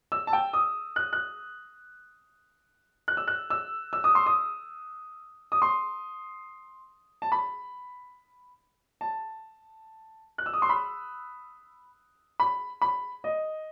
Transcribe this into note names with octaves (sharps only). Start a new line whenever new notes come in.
E6
A5
G5
D#6
F#6
F#6
F#6
E6
F#6
E6
E6
D#6
C6
D#6
D#6
C6
A5
B5
A5
F#6
E6
D#6
C6
B5
B5
B5
D#5